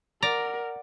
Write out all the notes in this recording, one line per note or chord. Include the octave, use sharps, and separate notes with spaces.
A#4 D5 F#5 A#5